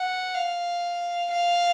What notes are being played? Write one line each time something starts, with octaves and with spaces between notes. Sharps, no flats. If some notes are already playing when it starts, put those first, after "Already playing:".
Already playing: F#5
F5
F5